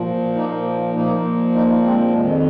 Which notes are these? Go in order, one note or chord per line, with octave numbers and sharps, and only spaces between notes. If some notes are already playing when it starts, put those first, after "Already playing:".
Already playing: A#2 F3
A#3 D#4
A#2 F3 A#3 D#4
A#3 D#4
G#3 C4
F2 D#3 G#3